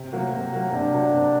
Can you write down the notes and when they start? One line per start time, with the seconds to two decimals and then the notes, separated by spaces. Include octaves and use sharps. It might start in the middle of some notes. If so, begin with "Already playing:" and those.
Already playing: C3
0.13 F#3 A#3 F#4
0.32 C3
0.52 F#3 A#3 F#4
0.72 C3 D4
0.92 F#3 A#3 F#4
1.13 C3